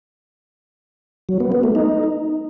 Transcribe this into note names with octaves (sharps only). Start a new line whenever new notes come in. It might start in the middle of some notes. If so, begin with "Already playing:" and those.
F#3
B3
B3
A3
D#4